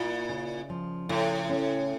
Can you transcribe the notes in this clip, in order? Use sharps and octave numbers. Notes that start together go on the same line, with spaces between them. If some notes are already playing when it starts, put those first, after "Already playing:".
Already playing: A#2 E4
C#3
F3
A2 C#3
C#4